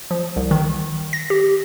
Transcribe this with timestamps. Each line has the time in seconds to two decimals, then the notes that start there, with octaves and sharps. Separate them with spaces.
0.11 F3
0.36 C2
0.51 D#3
1.13 A#6
1.30 G4